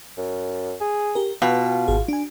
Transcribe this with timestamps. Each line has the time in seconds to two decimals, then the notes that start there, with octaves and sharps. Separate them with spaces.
0.18 F#2
0.81 G#4
1.15 G4 A#4
1.42 B2 F4 B4 F5 G5
1.88 G#1 G#4
2.08 D4 G#5